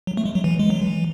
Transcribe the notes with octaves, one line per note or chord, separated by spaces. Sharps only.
F#3
A3
G#3
F#3
E3
G#3
F#3
E3